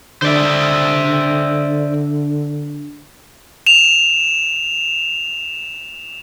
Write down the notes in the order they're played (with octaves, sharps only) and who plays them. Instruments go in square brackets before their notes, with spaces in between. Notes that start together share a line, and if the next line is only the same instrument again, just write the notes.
[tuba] D3 [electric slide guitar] C5 D5 E5
[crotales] E7 F7